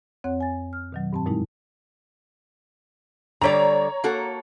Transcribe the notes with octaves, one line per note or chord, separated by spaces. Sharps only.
F2 C4 C#5 F#5 F#6
G#5 A6
F6
B2 D#3 F#3
G2 C4 A5
F#2 A#2 G3 G#3 D#4 E4
D3 G3 C#5 D5 A#5
A#3 F#4 A4